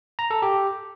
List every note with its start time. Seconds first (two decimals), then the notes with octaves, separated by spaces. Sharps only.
0.19 A#5
0.31 A4
0.42 G4